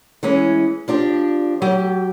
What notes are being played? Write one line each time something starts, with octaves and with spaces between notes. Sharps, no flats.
E3 G#3 C#4
F3 D4 G4
F#3 G4 G5